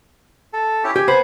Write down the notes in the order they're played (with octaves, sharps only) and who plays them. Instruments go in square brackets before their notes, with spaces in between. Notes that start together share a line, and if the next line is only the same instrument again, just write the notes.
[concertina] A4
C#4 E4 G4
[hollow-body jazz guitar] G4 [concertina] G#5
[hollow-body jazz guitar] B3 C5 B5